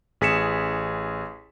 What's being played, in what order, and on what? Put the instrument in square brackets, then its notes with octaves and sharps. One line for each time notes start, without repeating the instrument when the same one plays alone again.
[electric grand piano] A1 G#4 B6 C#7 E7